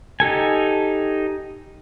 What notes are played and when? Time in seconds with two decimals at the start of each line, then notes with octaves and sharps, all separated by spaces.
0.20 D#4 G4 A4 G#5